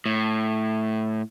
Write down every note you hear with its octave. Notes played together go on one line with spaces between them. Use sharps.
A2